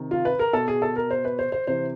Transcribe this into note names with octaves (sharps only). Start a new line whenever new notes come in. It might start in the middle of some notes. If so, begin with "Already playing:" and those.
Already playing: C3 D#3
F4
B4
A#4
B2 A4
G#4
A4
A#4
C5
B4
C5
C5
C3 E3 C5